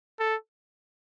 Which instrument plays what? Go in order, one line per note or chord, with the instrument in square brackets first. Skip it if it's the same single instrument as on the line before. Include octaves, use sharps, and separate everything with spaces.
[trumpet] A4